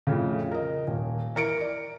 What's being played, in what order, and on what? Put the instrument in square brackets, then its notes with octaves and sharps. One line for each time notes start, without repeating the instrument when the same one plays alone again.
[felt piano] F2 A2 C#3
A#4 D#5
D#1
E3 A#4 C#7 D7
D5